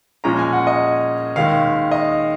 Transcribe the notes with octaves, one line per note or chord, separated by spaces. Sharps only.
A#2 F3 G#3 C#4 A#5
G#5
F#5
D#5
D#2 D#3 G#3 F5
D#5